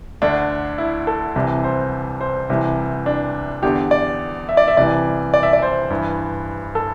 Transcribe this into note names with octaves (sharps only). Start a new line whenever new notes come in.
D2 D3 D4
E4
A4
C2 C3 E3
C5
C5
C2 C3 E3
D4
E2 D3 G4
D5
E5
D5
E5
C2 C3 E3 D5
D5
E5
D5
C5
G2 E3
A4